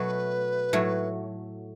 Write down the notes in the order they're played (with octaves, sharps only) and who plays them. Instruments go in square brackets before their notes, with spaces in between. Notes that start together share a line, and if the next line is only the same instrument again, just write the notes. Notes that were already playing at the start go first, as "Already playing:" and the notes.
Already playing: [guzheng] B2 F#3 A3 [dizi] B4
[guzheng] A2 F#3 A3